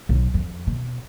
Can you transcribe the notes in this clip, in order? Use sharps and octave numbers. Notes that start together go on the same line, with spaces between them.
B1
F2
B2